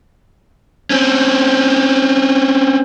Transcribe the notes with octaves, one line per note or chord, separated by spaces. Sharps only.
C4 C#4